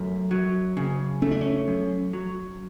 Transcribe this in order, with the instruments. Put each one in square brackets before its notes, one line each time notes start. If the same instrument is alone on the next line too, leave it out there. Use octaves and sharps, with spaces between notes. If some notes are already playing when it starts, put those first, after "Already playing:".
Already playing: [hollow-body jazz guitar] F#2 A3
F#3
C#3
[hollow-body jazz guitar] A3 [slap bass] C#4
[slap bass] D4
C#4
[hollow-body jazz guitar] F#2
F#3